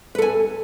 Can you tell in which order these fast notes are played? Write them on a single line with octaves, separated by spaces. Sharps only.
B4 A4 G#5